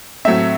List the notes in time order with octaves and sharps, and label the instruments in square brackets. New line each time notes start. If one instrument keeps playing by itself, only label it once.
[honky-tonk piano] A2 F#3 A3 C4 E5